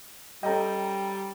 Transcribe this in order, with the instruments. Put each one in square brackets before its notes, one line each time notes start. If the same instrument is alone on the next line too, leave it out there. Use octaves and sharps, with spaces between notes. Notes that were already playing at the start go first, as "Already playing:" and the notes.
[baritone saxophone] G3 [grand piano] C#4 A4 D#5 [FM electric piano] G5 A#5